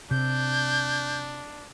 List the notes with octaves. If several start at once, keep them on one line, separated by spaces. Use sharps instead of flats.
C3 D4 G6